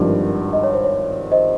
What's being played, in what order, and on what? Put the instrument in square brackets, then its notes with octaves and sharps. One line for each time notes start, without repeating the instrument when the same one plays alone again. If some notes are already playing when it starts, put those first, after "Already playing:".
Already playing: [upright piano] G#1 G2 F3 [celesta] A#4
[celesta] D#5
C#5
C5
C#5
C5 D#5